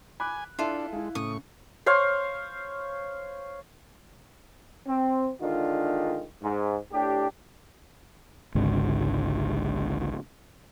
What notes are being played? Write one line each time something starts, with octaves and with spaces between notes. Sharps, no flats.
G#5 B5 D6 F#6
D4 E4 F4 A4 E5
G#3 E4 F5
A2 C#3 C#6 D#6
C5 C#5 F5
C4
D3 D#3 G#3 D4 F4
G#2
A2 D4 G4
G#1 C#2 G#2 D3